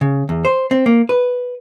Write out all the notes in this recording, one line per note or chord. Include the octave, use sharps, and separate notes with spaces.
C#3
E2
C5
C4
A#3
B4